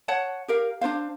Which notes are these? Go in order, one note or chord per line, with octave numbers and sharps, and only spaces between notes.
C#5 F#5 A5
G4 A#4 F5
D4 F4 C5 F5